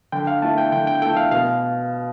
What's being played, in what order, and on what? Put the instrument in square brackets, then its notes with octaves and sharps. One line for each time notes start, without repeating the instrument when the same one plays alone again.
[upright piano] D3 [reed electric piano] G5
[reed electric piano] F5
[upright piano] A3 E4 A4 [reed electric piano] A5
[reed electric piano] G5
[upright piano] D3 [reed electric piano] G5
[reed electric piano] G5
[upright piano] A3 E4 A4 [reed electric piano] G5
[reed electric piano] F5
[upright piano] B2 [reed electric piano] F5